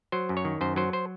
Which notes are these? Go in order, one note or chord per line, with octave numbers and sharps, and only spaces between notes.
F#3 C5
F#2
C#5
D#3
F#2 C5
F#3 C5
C5